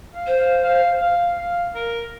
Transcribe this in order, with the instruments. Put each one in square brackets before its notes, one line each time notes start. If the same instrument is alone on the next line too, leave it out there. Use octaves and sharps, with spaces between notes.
[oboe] F5
[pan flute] C5
[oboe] F5
F5
F5
F5
A#4